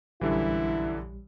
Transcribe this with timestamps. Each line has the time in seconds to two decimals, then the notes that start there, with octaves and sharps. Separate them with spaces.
0.21 A#1 F#2 D3 E3 G3 E4